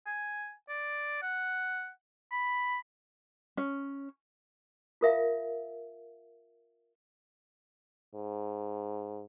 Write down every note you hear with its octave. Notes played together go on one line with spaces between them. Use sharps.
G#5
D5
F#5
B5
C#4
F4 A#4 E5 F5
G#2